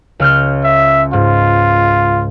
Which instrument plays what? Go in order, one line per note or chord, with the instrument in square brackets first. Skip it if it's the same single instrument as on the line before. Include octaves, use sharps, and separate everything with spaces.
[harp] C#2 F6 G6
[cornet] E5
[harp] G#2 [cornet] F4